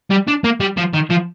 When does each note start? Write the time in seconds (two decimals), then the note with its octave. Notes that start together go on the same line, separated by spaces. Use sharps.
0.11 G3
0.28 D4
0.44 A#3
0.60 G3
0.77 F3
0.93 D#3
1.10 F3